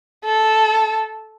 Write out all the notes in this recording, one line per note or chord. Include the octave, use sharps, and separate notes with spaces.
A4